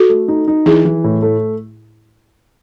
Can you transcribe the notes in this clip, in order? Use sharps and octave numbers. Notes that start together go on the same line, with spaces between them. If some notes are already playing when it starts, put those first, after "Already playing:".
Already playing: F#4 A4
A3
D#4
D#4
E3 E4 G#4
E3
A2
A3